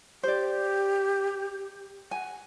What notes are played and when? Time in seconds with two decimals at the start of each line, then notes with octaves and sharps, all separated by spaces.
0.23 G4 C5 D5
2.11 F#5 G#5